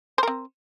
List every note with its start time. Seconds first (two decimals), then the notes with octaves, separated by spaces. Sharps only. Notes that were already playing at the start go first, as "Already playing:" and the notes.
0.18 C5
0.23 A#4
0.28 C4